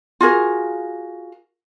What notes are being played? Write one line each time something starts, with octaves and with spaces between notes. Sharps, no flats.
F4 F#4 G#4 A#4